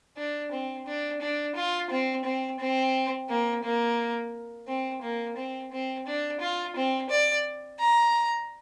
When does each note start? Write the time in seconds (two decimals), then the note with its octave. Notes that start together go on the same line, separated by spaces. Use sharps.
0.17 D4
0.52 C4
0.86 D4
1.21 D4
1.56 F4
1.90 C4
2.25 C4
2.59 C4
3.29 A#3
3.63 A#3
4.67 C4
5.02 A#3
5.37 C4
5.72 C4
6.06 D4
6.41 F4
6.76 C4
7.10 D5
7.79 A#5